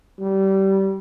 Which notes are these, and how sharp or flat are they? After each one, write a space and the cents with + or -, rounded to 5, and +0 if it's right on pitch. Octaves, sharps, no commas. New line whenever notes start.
G3 -20